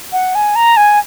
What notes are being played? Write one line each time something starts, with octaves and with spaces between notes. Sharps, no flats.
F#5
G#5
A#5
G#5